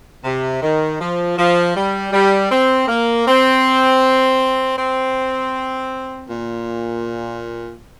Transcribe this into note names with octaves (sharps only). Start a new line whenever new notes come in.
C3
D#3
F3
F3
G3
G3
C4
A#3
C4
C4
A#2